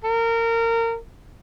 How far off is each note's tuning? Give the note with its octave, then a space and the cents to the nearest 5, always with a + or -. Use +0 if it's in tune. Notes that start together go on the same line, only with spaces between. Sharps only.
A#4 -25